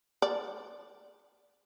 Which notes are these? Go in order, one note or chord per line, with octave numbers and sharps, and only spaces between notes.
D5